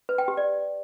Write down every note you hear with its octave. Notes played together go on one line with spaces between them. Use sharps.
B4
G5
G4
D5